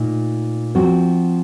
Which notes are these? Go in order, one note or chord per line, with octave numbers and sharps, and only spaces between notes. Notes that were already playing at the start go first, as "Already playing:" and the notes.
Already playing: A#2 A3 D#4
F3 C4 F#4